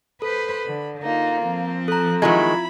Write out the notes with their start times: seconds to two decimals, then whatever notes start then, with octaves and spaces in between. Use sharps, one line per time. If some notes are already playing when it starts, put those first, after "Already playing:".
0.22 A4 B4 C5 B5
0.66 D3
1.03 A#3 D#4 F4
1.41 F3 C4
1.88 A4 A#5 F#6
2.22 D#3 F#3 G#3 E4 F4 A#5 B5 G#6